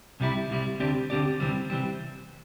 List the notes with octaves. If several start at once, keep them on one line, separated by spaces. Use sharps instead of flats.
C2 C3 G3 E4
C2 C3 G3 E4
D2 D3 C4 G4 D5
D2 D3 C4 G4 D5
D2 C3 E3 G3 C4
C3 E3 G3 C4